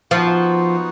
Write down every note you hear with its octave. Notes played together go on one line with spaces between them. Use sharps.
F3 B3 D#4 F#4